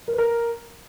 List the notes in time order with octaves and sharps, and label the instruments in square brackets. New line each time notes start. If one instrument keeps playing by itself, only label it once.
[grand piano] A#4
B4
A#4